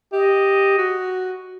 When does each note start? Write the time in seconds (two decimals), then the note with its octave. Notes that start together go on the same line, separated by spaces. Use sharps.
0.13 G4 D#5
0.78 F#4